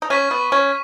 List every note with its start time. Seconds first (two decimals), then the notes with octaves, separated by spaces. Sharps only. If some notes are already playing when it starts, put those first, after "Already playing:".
0.02 D#4
0.10 C#4 C#6 B6 D#7
0.31 B3
0.52 C#4